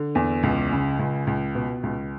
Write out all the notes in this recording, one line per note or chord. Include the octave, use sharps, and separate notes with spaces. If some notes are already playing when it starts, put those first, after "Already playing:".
Already playing: D3
E2
C#2
C#3
C#2
C#2
B2
C#2